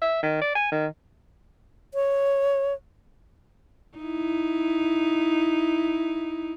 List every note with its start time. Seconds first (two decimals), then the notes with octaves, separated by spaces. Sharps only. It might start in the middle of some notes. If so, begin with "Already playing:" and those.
0.01 E5
0.23 D#3
0.41 D5
0.55 G#5
0.72 D#3
1.94 C#5
3.98 D#4 E4